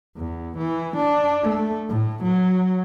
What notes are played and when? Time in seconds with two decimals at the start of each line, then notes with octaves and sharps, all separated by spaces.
0.17 E2
0.58 E3
0.96 D4
1.43 A3
1.89 A2
2.23 F#3